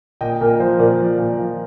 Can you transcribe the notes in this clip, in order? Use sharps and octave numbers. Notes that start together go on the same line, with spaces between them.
A#2 D#5 G5
A#2 A#4
F3 C5
A#2 A#4 D5
F3
A#2
F3